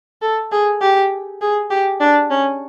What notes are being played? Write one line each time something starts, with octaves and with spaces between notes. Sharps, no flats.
A4
G#4
G4
G#4
G4
D4
C#4